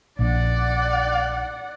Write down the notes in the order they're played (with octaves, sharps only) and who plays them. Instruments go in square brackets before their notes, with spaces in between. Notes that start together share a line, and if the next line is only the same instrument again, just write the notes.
[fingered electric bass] A#1 [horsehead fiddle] D5 F#5